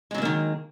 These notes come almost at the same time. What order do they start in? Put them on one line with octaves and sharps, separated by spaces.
G#3 F#3 D3 A#3 D#3